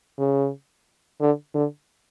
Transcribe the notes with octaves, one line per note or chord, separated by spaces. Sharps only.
C#3
D3
D3